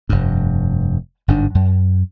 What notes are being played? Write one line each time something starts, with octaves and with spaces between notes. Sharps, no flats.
F1 G2
G1 G#2 D4
F#2